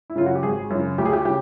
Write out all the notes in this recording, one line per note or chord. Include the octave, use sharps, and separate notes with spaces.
E4
F#2 C#3 F4
F#4
G4
G#1 G#4
F#2 C#3
D2 G4
G#4
G4
C#3 G4